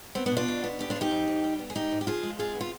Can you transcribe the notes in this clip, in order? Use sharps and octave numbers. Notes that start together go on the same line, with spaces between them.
B3 C4
B3 D4
B2
D4 F4
B2
B3
D3 G4
D4 F4
F3
D#4 G4
F2
F2
G3
B3
G#4
G#2 D#4 G4
G#2
G4
F3 F4 G#4
G#3
C3 F4 G#4
B3
F4